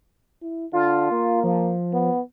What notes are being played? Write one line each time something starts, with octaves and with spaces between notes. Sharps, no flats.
E4
D3 F4
A#3
F3
B3